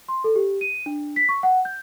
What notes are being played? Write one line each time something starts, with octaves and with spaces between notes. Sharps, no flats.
C6
A4
G4
D#7
D4
B6
C#6
F#5
G6